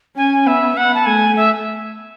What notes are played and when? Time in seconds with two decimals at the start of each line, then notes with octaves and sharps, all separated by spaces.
0.16 C#4 G#5
0.46 B3 E5
0.77 B3 F#5
0.94 A5
1.06 A3 G#5
1.36 E5